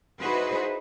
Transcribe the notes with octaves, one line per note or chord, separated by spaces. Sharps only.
D#4 E4 F#4 G#4 B4 C5